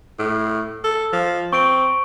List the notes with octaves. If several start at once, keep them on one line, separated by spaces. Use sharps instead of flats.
A2
A4
F3
C4 C#6 D7